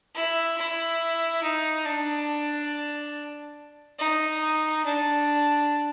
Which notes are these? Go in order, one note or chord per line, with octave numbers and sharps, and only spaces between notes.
E4
E4
D#4
D4
D#4
D4